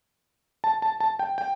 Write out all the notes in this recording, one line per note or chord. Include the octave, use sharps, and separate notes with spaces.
A5
A5
A5
G5
G5